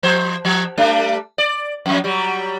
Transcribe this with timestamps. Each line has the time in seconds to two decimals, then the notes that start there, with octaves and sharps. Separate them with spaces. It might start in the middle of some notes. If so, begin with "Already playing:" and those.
0.03 F3 C5
0.45 F3
0.77 G3 A3 D4
1.38 D5
1.86 F2 F#3
2.04 F#3 G3